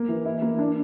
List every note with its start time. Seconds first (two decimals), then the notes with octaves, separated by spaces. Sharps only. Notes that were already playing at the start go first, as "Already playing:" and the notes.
Already playing: A#3
0.09 E3
0.25 E4
0.42 A#3
0.59 D4